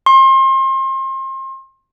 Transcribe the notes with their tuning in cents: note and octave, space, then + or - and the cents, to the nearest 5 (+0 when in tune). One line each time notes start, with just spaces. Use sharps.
C6 +35